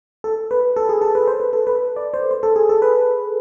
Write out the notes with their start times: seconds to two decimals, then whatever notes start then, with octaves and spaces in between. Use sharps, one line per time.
0.24 A4
0.51 B4
0.76 A4
0.89 G#4
1.01 A4
1.15 B4
1.28 C5
1.40 B4
1.53 A4
1.67 B4
1.96 D5
2.14 C5
2.31 C5
2.43 A4
2.56 G#4
2.69 A4
2.82 B4